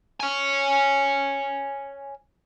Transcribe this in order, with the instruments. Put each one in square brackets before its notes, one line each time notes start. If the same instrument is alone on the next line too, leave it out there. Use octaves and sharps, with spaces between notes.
[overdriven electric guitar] C#5 G#5